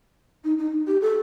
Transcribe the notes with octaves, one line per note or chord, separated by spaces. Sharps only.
D#4
D#4
G4
A4